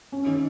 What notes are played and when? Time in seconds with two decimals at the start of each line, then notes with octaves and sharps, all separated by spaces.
0.12 C#4
0.26 D#3